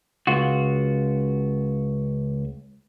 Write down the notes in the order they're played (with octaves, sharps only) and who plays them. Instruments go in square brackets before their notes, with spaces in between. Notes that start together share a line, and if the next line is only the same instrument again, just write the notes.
[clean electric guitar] C#2 F4 F#4